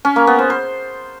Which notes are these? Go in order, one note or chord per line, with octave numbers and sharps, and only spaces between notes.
C#4
A#3
B3
C5
C5